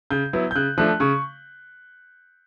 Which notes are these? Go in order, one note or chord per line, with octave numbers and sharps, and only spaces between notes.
C#3 G6
F#3 B3 E4
G6
C#3 F#6
F3 A3 D4 F#6
C#3 C#6